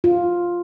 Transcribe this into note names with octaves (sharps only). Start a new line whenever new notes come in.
F4